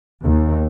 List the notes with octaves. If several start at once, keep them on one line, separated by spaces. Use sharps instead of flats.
D#2